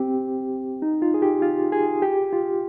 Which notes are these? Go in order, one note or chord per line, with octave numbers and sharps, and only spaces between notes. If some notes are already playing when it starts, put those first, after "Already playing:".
Already playing: C4 G4
D#4
F4
G#4
G4
F4
G#4
G4
F4